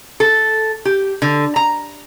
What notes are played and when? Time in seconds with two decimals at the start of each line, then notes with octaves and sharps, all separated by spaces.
0.20 A4
0.85 G4
1.22 D3
1.56 A#5